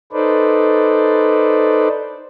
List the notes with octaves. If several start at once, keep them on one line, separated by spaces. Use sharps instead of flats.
D#4 A4 B4 C5 D5